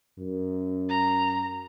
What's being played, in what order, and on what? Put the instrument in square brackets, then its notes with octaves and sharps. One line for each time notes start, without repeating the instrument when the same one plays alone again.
[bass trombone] F#2
[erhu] A#5